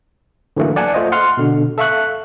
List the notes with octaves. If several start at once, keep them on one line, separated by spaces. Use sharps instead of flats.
D3 E3 F#3 A3 A#3
D5 F#5 G#5 A5
A3 F4 C5 D#5
F#5 C6 F6
B2 D3
A4 E5 F5 C#6 F#6